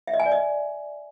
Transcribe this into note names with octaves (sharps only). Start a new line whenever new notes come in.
E5
D#5
G#5
D5
D#5